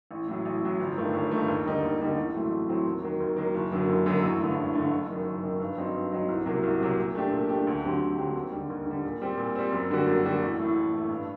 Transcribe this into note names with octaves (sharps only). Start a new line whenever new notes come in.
A1
A2 F#3
A1
A2 F#3
G1
G2 D#3 A3
G1
G2 D#3 A3
D#2
D3 G3 A#3 D#4
D#2
D3 G3 A#3 D#4
A1
A2 F#3 A3 C4
A1
A2 F#3 A3 C4
D#2
D#3 F#3 A#3
D#2
D#3 F#3 A#3
F#1
F#2 D3 F#3 A#3
F#1
F#2 D3 F#3 A#3
A1
G2 D3 A3
A1
G2 D3 A3
F#1
F#2 D#3
F#1
F#2 D#3
G2
F#3 C4 D#4
G2
F#3 C4 D#4
C2
C3 F#3 A#3
C2
C3 F#3 A#3
A#2
A3 D4 G4
A#2
A3 D4 G4
D2
D3 F#3 C4 G4
D2
D3 F#3 C4 G4
D#2
D3 G3
D#2
D3 G3
A#2
G3 C4
A#2
G3 C4
F#2
D3 G3 A#3 F#4
F#2
D3 G3 A#3 F#4
A1
A2 A3
A1
A2 A3
G2